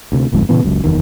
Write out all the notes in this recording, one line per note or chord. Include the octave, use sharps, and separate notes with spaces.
D2 C3
D1 G1 F2 G#2
A#2 C#3 E3 B3
F#1 C#2 F#2
F#1 E2 D#3